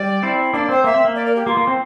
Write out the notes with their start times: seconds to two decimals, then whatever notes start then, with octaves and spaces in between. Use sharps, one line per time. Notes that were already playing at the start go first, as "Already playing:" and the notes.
Already playing: G3 D5
0.23 C4 E4
0.54 A#3 D4 D5
0.69 C4 C5
0.84 A#3 E5
0.94 C4
1.05 A#3
1.15 D5
1.26 A#4
1.36 G4
1.47 A#3 F4
1.57 A#3
1.67 C4